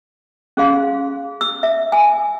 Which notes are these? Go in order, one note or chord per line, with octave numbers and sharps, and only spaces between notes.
C#4 G#4 F5 C6
E6
E5
G#5